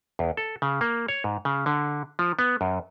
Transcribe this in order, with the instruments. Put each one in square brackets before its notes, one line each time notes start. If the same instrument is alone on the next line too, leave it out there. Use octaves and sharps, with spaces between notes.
[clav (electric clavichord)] E2
A4
C#3
A#3
C#5
G#2
C#3
D3
F3
B3
F#2